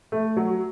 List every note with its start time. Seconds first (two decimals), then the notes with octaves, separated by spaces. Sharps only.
0.12 A3
0.36 F#3